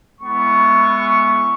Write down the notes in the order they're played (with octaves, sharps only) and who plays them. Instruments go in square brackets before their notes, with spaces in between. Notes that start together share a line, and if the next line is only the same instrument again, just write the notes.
[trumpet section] G#3 B3 E4 C#6